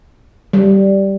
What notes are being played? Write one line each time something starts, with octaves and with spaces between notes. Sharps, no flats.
G3